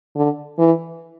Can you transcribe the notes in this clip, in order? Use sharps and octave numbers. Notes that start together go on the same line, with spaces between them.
D3
E3